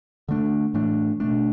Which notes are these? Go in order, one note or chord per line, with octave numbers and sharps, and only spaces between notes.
D3 A3 D4
A2 E3 A3 D4
B2 A3 D4